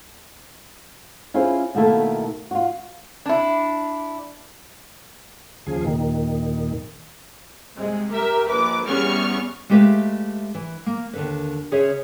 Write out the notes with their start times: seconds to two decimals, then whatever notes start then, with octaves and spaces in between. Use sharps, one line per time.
1.34 C#4 E4 F4 G#4 C5
1.75 B2 D#3 A3 A#3 E4 A4
2.51 F4 F#4
3.26 D4 E4
5.67 D#2 C#3 F3 G#4
5.85 D#2 A#2 D#3
7.75 C3 G#3
8.10 G4 A#4 E5
8.49 A#1 B4 D6
8.86 E2 G3 B3 C#4 C#6 F6
9.69 G#3 A3 G4 B4 E5 F5
10.55 E3
10.86 A#3
11.13 D#2 D3 B4
11.72 C#3 C#4 G#4 C5 C#5 E5